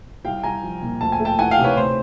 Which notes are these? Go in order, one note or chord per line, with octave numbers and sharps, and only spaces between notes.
C2 F5 G5
C2 G#5 A#5
F3
A#2
D2 A5
G#5
A3
G5 A5
E3 F#5 G#5
F5 G5
C3
B4 C#5
A2 C5